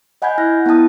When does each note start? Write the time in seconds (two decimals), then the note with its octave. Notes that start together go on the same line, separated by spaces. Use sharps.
0.22 D#5 F#5 G#5 B5 G6 G#6
0.38 E4 F6 F#6 A#6
0.66 B3 E4 G5 A5 D#6